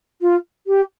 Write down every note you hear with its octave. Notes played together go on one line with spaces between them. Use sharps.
F4
G4